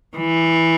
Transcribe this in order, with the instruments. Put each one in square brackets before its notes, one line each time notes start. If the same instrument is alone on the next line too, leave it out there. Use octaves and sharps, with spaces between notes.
[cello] E3